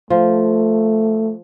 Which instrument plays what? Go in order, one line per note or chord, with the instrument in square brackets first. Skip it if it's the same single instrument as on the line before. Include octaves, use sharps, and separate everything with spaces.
[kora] F3 [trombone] A3